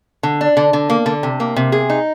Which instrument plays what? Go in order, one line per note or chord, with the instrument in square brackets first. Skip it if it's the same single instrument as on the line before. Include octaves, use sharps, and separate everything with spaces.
[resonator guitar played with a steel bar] D3
D4
D3
D3
A#3
D3
C3
A#3
C3
G#4
D#4